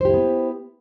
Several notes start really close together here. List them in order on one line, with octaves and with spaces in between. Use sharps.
C5 G4 E4 B3